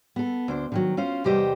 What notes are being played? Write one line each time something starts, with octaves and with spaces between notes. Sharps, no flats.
B3 A4
D2 D4 C5
D3 D#3 F#3
C#4 F4 C5
E2 C3 G3 G4 C5 D#5